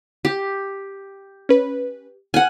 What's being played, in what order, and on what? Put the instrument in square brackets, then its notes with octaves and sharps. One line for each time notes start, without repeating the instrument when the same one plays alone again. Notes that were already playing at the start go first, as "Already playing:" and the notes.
[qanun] G4
[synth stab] C#4 B4
[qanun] F#5 G#5 [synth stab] F6 F#6